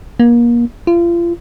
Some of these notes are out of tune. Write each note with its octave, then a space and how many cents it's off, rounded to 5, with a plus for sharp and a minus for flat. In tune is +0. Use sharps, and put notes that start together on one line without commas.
A#3 +30
F4 -35